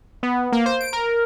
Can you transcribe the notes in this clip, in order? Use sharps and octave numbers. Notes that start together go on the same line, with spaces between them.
B3
A#3
C5
D7
A#4